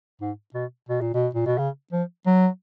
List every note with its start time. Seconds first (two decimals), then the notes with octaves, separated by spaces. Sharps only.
0.21 G#2
0.54 B2
0.89 B2
1.01 A#2
1.14 B2
1.35 A#2
1.46 B2
1.58 C#3
1.92 F3
2.26 F#3